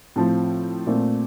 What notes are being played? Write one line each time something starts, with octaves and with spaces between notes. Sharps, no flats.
A2 F3 C4
A#2 A3 C4